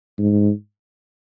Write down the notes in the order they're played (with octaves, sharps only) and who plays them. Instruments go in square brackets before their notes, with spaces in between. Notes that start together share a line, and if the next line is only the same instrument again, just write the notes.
[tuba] G#2